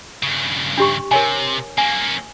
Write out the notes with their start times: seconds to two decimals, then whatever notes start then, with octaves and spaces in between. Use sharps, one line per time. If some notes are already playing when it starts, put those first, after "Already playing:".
0.23 G2 C#3
0.78 D4 G4 C#6
1.11 C3 A#4 C#5 G#5
1.78 A#3 C#4 G#5